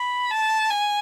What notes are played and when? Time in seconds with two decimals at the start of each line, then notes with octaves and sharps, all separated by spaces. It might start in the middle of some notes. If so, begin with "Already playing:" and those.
Already playing: B5
0.31 A5
0.70 G#5